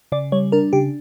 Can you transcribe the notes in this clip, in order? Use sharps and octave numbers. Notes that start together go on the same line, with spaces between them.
C#3 D5
G3 C#5
D4 A#4
C#3 G4